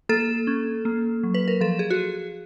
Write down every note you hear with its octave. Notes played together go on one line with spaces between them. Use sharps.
A#3 A4
C#4
A#3
F#3
B4
A#4
F3 A4
G#4
F#4